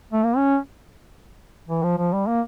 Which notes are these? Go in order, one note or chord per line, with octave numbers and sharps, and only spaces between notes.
A3
A#3
C#4
E3
F3
F3
G3
A#3